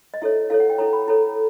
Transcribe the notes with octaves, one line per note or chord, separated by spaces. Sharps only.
D#5
E4 A4 C#5 E5
E4 A4 C#5 F5
F#5
G5
E4 A4 C#5 A#5
B5
E4 A4 C#5 A#5